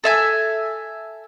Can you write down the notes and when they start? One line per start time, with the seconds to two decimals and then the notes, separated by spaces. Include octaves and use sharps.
0.04 A4 E5 G#5